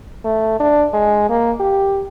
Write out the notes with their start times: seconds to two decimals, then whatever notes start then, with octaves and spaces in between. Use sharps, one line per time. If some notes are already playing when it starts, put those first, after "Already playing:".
0.25 A3
0.60 D4
0.93 G#3
1.29 A#3
1.60 G4